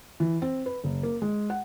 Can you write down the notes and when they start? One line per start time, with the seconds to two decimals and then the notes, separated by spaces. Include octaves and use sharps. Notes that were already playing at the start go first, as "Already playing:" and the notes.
0.20 E3
0.42 C4
0.66 B4
0.84 F#1
1.03 A#3
1.22 G#3
1.50 F#5